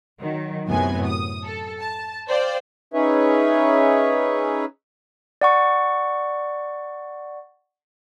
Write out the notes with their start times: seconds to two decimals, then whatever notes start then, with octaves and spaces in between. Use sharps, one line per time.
0.21 D#3 F#3
0.67 F#2 A2 C3 B3 G#5
1.06 D#6
1.45 A4
1.80 A5
2.27 C5 D5 F5 G5
2.94 C#4 D#4 G#4 B4 C#5 E5
5.41 D5 F#5 C#6